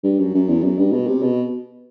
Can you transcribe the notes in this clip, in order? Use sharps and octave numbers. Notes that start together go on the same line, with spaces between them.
G2
F#2
F#2
E2
F#2
G2
B2
C3
B2